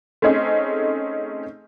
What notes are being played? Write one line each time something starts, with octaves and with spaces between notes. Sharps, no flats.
A3 C4 C#4 D#4 G#4